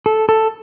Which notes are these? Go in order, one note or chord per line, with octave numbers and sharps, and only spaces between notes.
A4
A4